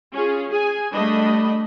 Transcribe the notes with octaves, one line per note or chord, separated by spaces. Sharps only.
C#4 F4 G#4
G#4 G#5
G3 A3 D4 D#5 B5